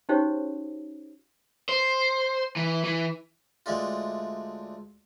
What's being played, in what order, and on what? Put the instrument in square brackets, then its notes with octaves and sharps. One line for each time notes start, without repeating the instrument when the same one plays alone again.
[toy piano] C#4 D#4 F#4 G4 C5 C#5
[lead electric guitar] C5
E3
E3
[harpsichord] D2 G#3 A3 D4 F4